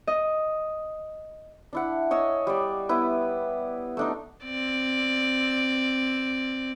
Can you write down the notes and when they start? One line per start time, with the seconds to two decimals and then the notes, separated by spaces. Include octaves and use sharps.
0.07 D#5
1.73 D4 E4 F#5
2.11 C#5 D#5 G#5 E6
2.47 G3 D5
2.89 B3 E4 B4
3.97 A3 D4 D#4
4.44 C4 D5